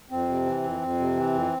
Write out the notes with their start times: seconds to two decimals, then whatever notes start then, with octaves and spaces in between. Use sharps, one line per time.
0.11 F2 C4
0.29 C3
0.46 E3
0.64 F2
0.81 F2
0.99 C3
1.17 E3
1.34 F2